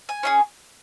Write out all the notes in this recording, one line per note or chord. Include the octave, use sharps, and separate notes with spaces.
G#5
C#4 F4 G#4